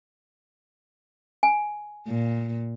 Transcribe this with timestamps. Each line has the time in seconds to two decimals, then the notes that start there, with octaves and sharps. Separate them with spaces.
1.43 G#5
2.08 A#2